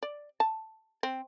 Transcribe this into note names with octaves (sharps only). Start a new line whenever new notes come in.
D5
A5
C4